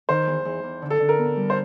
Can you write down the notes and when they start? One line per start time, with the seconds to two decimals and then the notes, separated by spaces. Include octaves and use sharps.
0.09 D#3 C5
0.27 E2
0.45 E2
0.63 E2
0.82 D3
0.90 A4
1.00 D3
1.09 A#4
1.18 B3
1.36 G3
1.50 C5